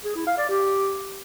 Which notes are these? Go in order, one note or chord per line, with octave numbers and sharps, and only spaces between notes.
G#4
E4
F5
D5
G4